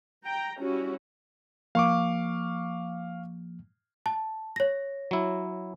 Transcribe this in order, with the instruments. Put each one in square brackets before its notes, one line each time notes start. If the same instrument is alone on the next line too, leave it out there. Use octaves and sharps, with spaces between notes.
[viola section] G5 A#5
G3 C#4 E4 F#4
[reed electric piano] F3 A#3 [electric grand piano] F5 C#6 D6
[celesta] A5
C#5 A#6
[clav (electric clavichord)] F#3 E4